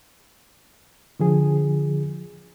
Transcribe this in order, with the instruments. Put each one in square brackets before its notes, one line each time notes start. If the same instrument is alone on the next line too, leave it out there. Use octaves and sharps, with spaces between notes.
[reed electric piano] D3 F3 G#4